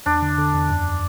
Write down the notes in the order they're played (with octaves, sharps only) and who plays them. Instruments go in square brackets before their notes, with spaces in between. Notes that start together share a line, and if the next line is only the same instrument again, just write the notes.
[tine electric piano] E2 [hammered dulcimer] D4
[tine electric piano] D3
D3
E2
F#2